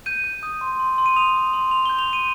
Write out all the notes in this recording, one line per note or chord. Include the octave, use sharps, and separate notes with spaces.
G6 D#7
G6
D#6
C6
C6
C6
D#7
D#6 F7
D#6
C6
C6 F7
G6 G7
F7
C6
D#7